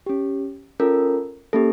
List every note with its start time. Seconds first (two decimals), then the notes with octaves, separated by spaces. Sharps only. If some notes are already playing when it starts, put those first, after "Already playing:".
0.06 C#4 G4
0.80 C#4 F4 A4 A#4
1.53 A#3 C#4 G4 A4